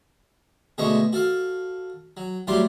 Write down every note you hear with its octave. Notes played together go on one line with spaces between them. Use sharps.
B2 D3 G#3 A3 D#5 C#6
F#4 A4 F5
F#3
A2 F#3 G3 D5 C6